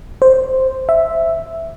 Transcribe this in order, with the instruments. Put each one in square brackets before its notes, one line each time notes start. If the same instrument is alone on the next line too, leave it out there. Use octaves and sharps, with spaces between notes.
[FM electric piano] C5
E5